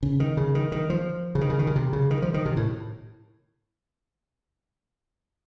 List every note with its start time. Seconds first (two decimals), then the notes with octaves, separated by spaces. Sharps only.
0.03 C#3
0.20 D#3
0.37 C#3
0.55 D#3
0.72 D#3
0.90 F3
1.35 C#3
1.41 D#3
1.50 C#3
1.59 D#3
1.67 C#3
1.76 C3
1.93 C#3
2.10 D#3
2.22 F3
2.34 D#3
2.46 C3
2.57 A2